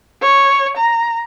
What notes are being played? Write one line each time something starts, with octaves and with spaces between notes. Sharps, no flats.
C#5
A#5